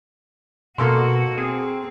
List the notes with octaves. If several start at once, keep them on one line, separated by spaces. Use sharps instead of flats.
B2 A#3 F#4 A4 C6
C4 G#4